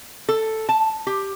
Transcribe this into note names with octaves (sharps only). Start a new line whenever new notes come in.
A4
A5
G4